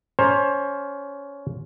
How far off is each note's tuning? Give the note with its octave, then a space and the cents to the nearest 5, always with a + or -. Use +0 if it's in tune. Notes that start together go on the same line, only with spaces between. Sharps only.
C#4 +20 C5 +25 A#5 +10